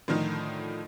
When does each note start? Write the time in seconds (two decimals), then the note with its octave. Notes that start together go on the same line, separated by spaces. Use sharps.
0.08 A2 D3 D#3 F3 D#4